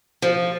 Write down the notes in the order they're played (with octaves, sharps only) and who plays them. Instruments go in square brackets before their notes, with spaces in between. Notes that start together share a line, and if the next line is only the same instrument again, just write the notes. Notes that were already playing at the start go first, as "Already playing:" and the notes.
[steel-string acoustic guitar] F3